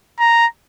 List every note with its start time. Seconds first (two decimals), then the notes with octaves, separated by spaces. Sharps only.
0.20 A#5